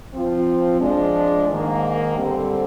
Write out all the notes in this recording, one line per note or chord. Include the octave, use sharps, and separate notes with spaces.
F3 C4 F4
F3 G#3 D4
G#2 D#3 A#3
D3 G3 C4